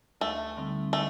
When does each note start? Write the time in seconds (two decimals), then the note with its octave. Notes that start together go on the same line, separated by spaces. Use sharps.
0.21 D2 A3
0.57 D3 G3 C4 D#4
0.93 A3